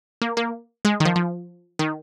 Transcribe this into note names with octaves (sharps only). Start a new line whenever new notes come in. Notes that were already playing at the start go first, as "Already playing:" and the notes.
A#3
A#3
G#3
D#3
F3
F3
D#3